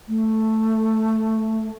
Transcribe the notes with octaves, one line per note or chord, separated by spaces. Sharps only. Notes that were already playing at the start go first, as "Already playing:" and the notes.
A3